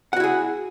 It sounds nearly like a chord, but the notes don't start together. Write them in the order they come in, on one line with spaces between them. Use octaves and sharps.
F#5 F#4 E4 G#4